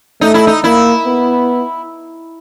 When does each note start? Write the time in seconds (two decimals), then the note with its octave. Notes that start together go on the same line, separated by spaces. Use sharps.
0.21 A3 D#4
0.34 E4
0.47 D#4
0.64 A#3 E4
1.06 B3